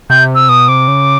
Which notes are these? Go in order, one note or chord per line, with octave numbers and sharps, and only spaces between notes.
C3 G6
E6
B2 D#6
C3 D6
C#3